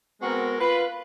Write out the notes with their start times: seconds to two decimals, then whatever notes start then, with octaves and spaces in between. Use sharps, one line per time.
0.22 G#3 B3 C4 F#4 A#4
0.60 F4 B4